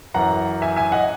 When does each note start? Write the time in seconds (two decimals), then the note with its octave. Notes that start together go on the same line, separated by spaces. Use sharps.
0.14 F#2 E3 F#5 A#5
0.62 E5 G#5
0.76 E5 G#5
0.92 D#5 F#5